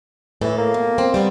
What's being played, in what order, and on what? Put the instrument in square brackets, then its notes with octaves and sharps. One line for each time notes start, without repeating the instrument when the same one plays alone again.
[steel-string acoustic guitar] A2 A4 [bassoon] E3
[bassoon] A#3
[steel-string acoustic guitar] B2
C4
G3 B3 C4